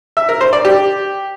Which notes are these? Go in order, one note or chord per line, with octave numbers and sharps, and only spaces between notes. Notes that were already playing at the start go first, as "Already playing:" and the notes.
E5
A#4
C5
D5
G4